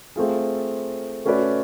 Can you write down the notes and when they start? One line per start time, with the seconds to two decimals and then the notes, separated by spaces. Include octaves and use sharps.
0.16 A3 C4 F4 G#4
1.25 A3 C#4 F#4 B4 D5